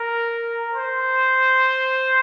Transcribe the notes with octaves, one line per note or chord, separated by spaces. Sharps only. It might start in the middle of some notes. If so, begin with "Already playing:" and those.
Already playing: A#4
C5